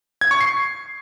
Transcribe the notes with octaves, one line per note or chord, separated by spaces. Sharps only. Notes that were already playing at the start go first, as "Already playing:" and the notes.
G#6
C#6
C7